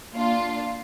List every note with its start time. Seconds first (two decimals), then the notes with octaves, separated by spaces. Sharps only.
0.15 A#3 D4 F4